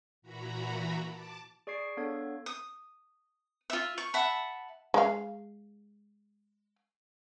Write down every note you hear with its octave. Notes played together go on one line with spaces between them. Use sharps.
A#2 E3 F#4 A#5 B5
A5 D6
G#4 D5 C#6 G#6 C7 D7
B3 D4 A4 C#5 F5 G#6
D#6
F4 E5
C#6
E5 F#5 A5 B5
G#3 F5